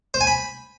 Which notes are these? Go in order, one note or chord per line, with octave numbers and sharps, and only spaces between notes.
C5
G#5
B5